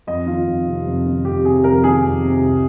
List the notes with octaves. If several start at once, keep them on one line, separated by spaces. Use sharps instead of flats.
F2 D#5
D#3 F4
F2
C3
F2
D#3
F2 G4
C3 G#4
F2 A#4
D#3 G#4
F2
C3
C2